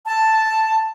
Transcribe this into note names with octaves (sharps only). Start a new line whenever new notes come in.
A5